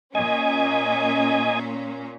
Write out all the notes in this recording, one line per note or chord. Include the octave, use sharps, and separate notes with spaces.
A#2 C#4 D#5 G#5